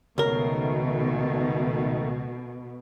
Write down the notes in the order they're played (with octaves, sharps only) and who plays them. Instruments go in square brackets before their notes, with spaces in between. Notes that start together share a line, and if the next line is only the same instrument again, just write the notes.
[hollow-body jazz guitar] C#2 A#4 [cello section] B2 [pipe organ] D#3 A3